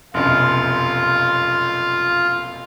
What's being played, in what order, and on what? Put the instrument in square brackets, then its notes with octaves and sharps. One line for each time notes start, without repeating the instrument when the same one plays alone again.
[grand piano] F1 B1 F#2 [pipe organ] F4